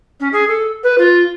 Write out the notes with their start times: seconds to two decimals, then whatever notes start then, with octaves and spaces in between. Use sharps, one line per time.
0.20 C#4
0.32 G#4
0.48 A4
0.83 B4
0.98 F4